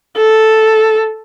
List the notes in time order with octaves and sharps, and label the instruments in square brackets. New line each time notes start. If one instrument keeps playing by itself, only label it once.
[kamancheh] A4